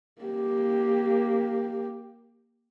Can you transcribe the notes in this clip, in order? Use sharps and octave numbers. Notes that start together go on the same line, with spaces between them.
A#3 G4